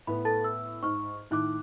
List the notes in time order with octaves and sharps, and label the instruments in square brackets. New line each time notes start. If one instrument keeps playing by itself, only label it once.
[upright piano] A2 B3 [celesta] B5
[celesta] A4 A5 A6
E6
[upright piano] G#2 F6 [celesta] C#6
[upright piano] A2 D#3 F#6 [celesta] D#4 D6